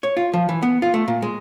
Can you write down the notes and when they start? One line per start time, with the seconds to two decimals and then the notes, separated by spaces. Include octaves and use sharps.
0.03 C#5
0.17 F4
0.34 F3
0.49 E3
0.62 B3
0.82 F4
0.94 A3
1.08 A#2
1.22 G#3